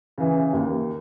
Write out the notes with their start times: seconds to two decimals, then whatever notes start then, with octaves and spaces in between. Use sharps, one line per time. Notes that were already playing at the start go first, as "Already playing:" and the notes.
0.18 C#3 E3
0.53 D#2